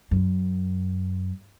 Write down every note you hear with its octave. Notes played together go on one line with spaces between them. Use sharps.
F#2